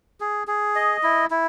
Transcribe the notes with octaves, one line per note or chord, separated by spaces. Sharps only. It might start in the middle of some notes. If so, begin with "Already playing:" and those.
G#4
G#4
D#5
E4
E4